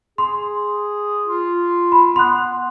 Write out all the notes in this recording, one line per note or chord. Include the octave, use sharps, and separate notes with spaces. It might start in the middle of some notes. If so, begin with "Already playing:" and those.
G#4 C6
F4
B5
B3 C6 F#6